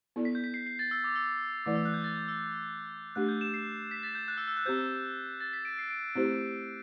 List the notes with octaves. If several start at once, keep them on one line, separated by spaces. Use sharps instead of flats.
B3 E4 A4 D5
B6
G6
B6
C7
C7
A6
E6
D6
E6
E3 A3 E4 B4 D5 D6
E6
F#6
G6
A6
G6
E6
A3 D4 G4 F#6
G6
E7
C7
B6
A6
G6
F#6
E6
E6
F#6
C4 G4 C5 G6
A6
B6
D7
C7
D7
D7
A3 C4 E4 G4 C5